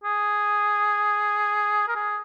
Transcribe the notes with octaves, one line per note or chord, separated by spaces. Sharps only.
G#4
A#4
G#4